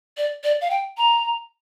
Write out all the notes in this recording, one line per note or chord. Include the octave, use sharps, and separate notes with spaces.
D5
D5
F5
G5
A#5